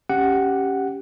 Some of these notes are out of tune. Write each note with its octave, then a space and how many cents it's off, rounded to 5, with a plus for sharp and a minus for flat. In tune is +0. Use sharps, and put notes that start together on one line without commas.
C#4 +0 G4 +0 F#5 +0